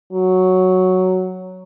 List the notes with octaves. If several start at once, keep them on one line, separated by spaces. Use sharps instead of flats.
F#3